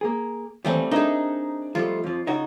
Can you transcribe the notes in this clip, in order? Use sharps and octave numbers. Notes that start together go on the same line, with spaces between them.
A#3 G#4
D#2 E3 G3 A3 C4
D4 D#4 G#4 A#4 E5
F3 G3 A3 F4
F2 F3
C#3 D#4 F#4